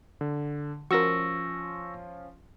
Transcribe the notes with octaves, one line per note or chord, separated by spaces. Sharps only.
D3
F3 C#4 F4 F#4 A#4 C#6 E6 A#6